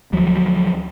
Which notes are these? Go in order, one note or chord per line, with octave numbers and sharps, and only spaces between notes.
D2 F3 F#3